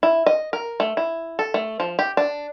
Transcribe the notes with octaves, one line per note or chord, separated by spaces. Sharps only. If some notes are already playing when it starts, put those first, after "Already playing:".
E4
D#5
A#4
A3
E4
A4
A3
F3
G4
D4